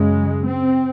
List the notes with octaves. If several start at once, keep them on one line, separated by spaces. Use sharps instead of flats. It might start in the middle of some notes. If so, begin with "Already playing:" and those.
Already playing: F#2 C#3 G#3
C4